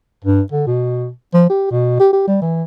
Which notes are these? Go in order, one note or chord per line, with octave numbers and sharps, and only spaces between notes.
G2
D3
B2
F3
G4
B2
G4
G4
G3
E3